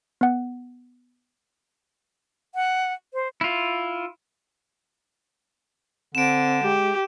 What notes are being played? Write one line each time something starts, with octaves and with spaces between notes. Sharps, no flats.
B3 F#5
F#5
C5
E4 F4
D3 C4 D7 E7
G#3 G4